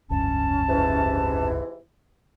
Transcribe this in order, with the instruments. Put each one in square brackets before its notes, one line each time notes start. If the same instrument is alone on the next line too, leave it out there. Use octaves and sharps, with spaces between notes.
[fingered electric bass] F1 C#2 G2 [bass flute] C#4 [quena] A5
[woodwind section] G#2 C3 E3